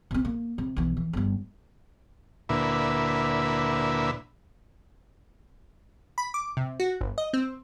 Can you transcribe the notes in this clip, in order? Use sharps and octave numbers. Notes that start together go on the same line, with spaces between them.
C3 C4
A#3
C3
B1 E3
E3
G1 G3
D2 A#2 E4 B4
B5
D6
C3
F#4
G1
D#5
C4